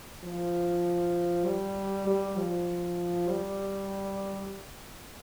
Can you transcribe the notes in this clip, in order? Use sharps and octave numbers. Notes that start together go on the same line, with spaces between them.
F3
G3
G3
F3
G3